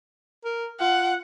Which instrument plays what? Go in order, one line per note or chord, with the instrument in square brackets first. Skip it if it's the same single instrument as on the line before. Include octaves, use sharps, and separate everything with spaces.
[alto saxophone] A#4
[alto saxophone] F4 [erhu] F#5